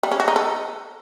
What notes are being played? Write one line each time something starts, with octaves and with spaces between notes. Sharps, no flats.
G3
C#4
F#4
D#4
A4